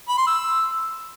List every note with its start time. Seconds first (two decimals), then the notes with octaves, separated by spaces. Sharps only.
0.08 B5
0.18 C6
0.27 E6